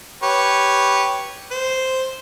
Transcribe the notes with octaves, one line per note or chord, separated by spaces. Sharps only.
G4 B4 C#5
C5